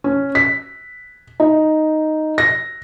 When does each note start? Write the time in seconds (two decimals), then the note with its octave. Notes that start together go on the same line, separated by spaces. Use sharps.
0.04 C#4
0.35 B6
1.40 D#4
2.38 A#6